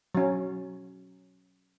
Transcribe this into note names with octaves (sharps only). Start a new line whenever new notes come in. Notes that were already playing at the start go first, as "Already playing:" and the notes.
F#3 C#4